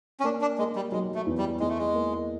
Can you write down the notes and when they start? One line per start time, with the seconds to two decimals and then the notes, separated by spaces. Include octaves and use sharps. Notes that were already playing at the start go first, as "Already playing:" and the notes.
0.20 C#4
0.24 A#3 D4
0.41 D4
0.58 G#3 A#3
0.76 G3
0.92 F#3 G#3
1.15 A3
1.26 E2
1.38 G3
1.60 E2 G#3
1.69 A3
1.78 G#3
1.94 A#3